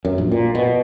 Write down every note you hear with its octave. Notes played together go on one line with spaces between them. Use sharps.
F#2
A#1
A#2
B2